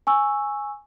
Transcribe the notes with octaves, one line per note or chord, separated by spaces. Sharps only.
G#5 C#6 E6